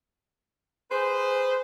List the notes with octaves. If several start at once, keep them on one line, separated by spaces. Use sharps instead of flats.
G#4 B4 C5